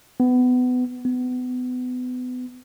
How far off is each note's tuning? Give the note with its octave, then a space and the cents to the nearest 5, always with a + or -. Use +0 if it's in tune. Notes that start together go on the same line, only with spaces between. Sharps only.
B3 +25
B3 +30